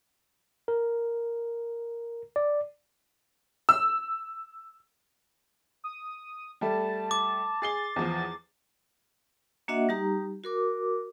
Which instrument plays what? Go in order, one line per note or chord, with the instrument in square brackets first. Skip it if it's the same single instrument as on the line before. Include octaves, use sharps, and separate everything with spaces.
[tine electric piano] A#4
D5
[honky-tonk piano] E6
[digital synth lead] D#6
[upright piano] G3 A3 [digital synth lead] A5
[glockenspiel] D6
[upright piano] G#4 C7 G7 [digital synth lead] A6
[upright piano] E2 F3
[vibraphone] A#3 D4 F#4 D#5 E5 F#5
G3 D#4 G4 A#5
F#4 A#4 D6